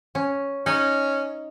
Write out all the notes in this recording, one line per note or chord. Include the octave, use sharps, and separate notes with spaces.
C#4
C#4 D#4